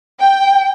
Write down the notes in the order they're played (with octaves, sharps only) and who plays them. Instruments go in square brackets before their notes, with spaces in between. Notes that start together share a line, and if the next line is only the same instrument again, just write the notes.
[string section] G5